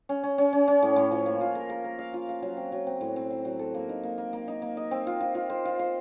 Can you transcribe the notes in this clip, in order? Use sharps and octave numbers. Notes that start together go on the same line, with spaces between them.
C#4
C#4
C#4
C#4
C#4
A2
A2
F3
A#3
F4
A#4
A#4
A#4
F5
F4
F5
F#3
C4
F#3
C4
A2
C4
F#3
F#3
A4
A#3
D#4
A#3
A#3
A#3
D#4
A#3
D#5
C4
F4
F4
F4
C5
F4
C5